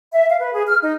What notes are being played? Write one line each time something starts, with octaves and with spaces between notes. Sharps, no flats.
E5
F5
B4
G#4
F6
D#4